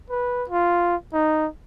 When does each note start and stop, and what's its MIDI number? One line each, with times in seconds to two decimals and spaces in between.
0.10 0.44 71
0.49 0.96 65
1.13 1.47 63